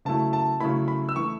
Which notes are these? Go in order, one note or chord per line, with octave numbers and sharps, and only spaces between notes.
C#3 F#3 A3 E4 A5
A5
C#3 F#3 A3 E4 B5
B5
E6
E3 A3 E4 C#6